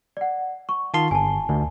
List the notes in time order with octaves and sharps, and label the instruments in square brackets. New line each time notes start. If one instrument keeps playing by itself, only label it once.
[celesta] D5 F#5
C#6
[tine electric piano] D#3 F4 C6 [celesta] A5
[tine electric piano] G1 [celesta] G#5 A5
[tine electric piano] D2